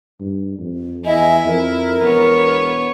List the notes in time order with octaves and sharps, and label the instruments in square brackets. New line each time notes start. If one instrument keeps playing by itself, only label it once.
[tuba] G2
F2
[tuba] E2 [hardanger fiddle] E4 [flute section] D#5 E5 G#5
[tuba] F2 [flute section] A#4
[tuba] E1 [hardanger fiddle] B3 C#5